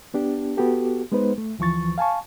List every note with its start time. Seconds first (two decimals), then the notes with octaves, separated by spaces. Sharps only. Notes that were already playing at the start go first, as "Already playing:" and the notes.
0.14 B3 D4 G4
0.57 B3 F#4 G4 A4
1.12 G#3 B3 D#4 B4 C5
1.38 A3
1.59 D2 E3 F3 C#6 A6
1.98 F5 G#5 A5 C#6